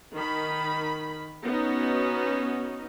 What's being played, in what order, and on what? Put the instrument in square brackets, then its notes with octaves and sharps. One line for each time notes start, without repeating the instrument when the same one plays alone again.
[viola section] D#3 B5
B3 C#4 D#4 F#4